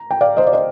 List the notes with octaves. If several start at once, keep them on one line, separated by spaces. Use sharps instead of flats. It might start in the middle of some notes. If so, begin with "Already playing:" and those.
Already playing: A#5
G5
D5 F5
C5 D#5
D5
C5 D#5